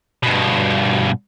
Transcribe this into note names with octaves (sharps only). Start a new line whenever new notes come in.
G2 B2